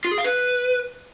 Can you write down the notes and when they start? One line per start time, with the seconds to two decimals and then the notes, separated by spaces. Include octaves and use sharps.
0.05 F4
0.11 G#4
0.18 F5
0.24 B4